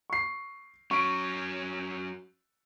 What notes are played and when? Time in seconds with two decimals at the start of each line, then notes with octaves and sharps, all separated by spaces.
0.10 C#6 C7
0.91 F#3 C#4 C#6 D7